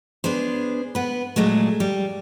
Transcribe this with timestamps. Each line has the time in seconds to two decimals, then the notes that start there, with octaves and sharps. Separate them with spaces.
0.24 B3 D4 G#4 C5
0.95 B3 B4
1.36 A#2 F#3 G#3 A3
1.80 G3